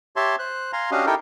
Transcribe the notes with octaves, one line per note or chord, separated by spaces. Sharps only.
G4 C#5 E5 A5 C6
C5 F#6
F5 G#5 A#5 C6
C#4 D4 F#4 G4 D#5 F5
D#4 E4 G4 A4 A#4 G5